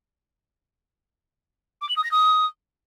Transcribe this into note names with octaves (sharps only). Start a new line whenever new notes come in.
D6
F#7
D#6
A#6
D#6